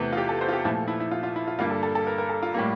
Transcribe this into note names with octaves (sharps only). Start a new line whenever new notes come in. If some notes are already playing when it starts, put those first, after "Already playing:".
Already playing: E2 C3 E3 A3
F4
G4
A4
C5
F4
G4
A#2 F3 A3 E4
E4
E4
F4
F4
E4
F4
G2 D3 G3 A#3 F4
A4
A4
A4
A#4
A#4
A4
F4
A2 G3 A#3